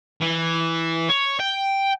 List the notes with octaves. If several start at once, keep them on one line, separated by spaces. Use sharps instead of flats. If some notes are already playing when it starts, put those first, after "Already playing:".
E3
C#5
G5